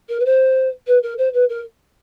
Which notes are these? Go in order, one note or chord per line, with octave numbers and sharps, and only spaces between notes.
A#4
B4
C5
B4
A#4
C5
B4
A#4